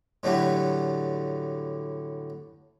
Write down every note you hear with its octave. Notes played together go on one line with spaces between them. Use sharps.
A2 D3 F#3 G3 B3